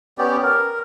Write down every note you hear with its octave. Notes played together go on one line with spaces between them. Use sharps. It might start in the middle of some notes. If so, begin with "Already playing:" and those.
B3 C#4 G4 D5
A#4